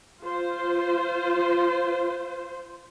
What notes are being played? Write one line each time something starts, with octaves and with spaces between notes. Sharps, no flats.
F4 C5